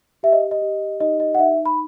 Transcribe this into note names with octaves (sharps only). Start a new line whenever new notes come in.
G4 E5
D#5
D#5
G4
D#4 D#5
D#5
F#5
D#4 E5
B5